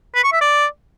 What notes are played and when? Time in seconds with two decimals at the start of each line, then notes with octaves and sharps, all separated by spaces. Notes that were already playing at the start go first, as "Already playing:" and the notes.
0.15 B4
0.24 C#6
0.33 E5
0.41 D5